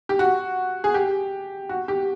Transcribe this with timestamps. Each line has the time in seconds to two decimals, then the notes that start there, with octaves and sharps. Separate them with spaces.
0.09 G4
0.19 F#4
0.84 G#4
0.94 G4
1.69 F#4
1.88 G4